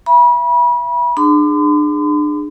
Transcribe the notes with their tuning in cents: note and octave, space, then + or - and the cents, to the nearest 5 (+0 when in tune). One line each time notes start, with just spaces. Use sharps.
E5 +30 B5 -35
D4 +30 G#4 +0 C6 -45